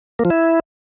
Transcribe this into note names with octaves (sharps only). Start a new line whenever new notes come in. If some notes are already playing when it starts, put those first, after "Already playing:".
A#3
F3
E4